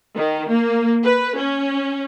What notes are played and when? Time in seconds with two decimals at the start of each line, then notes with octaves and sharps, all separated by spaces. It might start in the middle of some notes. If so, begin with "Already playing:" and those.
0.16 D#3
0.50 A#3
1.05 B4
1.37 C#4